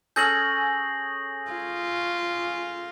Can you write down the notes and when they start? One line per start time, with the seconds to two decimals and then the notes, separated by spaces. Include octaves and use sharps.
0.16 C#4 G#4 A4 G6 A#6 F#7
1.51 F4